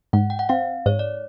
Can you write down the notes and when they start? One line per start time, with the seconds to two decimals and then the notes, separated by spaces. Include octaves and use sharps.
0.13 G#2 F#5
0.30 G5
0.39 F#5
0.49 C4 F5
0.86 G#2 C#5
0.99 D5